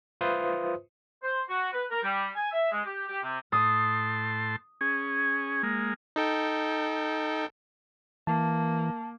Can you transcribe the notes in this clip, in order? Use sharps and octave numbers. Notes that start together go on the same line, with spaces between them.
F4 B4 C5 E5 C6 D#6
C5
F#4
B4
A#4
G3
G#5
E5
G#3
G4
G4
C3
A2 A5 C6 D#6
C#4 G#4
G#3 A#3
D#4 A4 G5
E3 A#3 A5